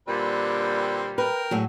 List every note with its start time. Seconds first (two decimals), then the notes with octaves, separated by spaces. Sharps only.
0.08 A#2 D3 G3 C4 B4
1.18 A#4 B4 G5
1.51 A2 F#3 G#4